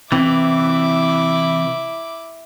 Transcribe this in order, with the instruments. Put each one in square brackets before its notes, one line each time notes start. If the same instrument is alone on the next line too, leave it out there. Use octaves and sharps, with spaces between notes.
[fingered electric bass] C3 C4 [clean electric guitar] E3 [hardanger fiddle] E4 D6